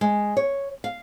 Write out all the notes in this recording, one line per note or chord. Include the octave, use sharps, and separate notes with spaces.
G#3
C#5
F5